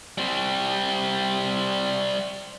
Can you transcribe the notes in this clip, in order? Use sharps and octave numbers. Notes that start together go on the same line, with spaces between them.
G3 C4